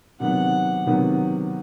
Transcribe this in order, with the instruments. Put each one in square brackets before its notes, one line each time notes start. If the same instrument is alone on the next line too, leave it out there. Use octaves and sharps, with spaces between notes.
[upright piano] C3 D#3 F#3 B3 [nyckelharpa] F#5
[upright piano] C3 D#3 F#3 B3